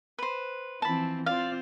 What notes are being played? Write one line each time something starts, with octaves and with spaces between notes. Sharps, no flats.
B4 C5
E3 F3 C4 A5 B5
C4 F4 C5 D5 F5